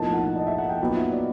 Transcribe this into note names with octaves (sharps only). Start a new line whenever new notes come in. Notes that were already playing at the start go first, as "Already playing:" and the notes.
Already playing: B1 A2 F3 A#3 D#4 A5
F#5
D#5
E5
F#5
G5
A#2 F#3 B3 D#4 F#5
E5
D5